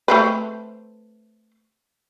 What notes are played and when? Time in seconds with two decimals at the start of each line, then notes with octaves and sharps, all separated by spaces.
0.08 A3 C4 B4